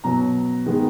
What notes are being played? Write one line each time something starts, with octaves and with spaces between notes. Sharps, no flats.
B2 F#3 B3 A#5
D#3 G#3 B3